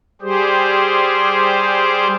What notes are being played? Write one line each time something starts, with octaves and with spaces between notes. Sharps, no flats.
G3 G4 G#4 C5